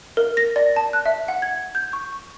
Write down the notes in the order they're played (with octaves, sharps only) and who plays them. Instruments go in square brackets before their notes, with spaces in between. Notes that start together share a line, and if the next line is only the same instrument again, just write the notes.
[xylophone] A#4
A#6
D5
A5
F#6
E5
F#5
G#6
G6
C#6